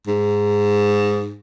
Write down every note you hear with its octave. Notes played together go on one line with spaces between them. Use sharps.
G#2